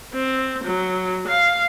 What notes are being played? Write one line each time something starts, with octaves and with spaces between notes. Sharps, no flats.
C4
F#3
F5